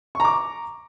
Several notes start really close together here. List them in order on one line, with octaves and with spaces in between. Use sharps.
C#6 A#5 D6